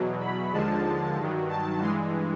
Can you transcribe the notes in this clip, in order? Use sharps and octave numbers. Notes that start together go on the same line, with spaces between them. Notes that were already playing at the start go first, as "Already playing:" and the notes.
Already playing: E2 B2 F#3
B5
D#2 D3 F3 G#3 A5
G2 D#3 F#3
A5
G2 E3 G#3 C6